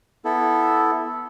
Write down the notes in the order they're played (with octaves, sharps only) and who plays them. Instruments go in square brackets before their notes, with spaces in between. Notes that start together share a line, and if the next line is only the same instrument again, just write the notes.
[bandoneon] B3 E4 A4